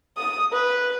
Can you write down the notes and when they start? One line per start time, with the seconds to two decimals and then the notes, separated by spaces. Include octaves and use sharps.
0.18 D#6
0.53 B4